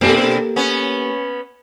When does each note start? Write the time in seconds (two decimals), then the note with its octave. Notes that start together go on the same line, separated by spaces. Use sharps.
0.01 B2 A#3 C4 D4 G4 A4
0.56 B3 C#4